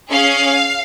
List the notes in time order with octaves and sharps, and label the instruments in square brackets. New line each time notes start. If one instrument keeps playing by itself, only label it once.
[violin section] C#4 G#4 F5